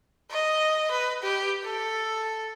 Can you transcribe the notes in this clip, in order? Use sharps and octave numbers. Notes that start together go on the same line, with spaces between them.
D#5
B4
G4
A4